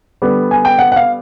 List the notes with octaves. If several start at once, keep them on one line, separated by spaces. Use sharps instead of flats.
D3 G3 B3
G#5
G5
F#5
F#5
F5